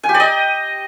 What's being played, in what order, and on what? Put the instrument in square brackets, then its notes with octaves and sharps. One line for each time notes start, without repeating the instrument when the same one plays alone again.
[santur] G#5
G4
D5
D#5